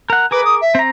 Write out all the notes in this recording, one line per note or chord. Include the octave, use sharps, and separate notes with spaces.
A#4 F#5
G#4 A#4 B4 D6
D#6
E5
C4 A#5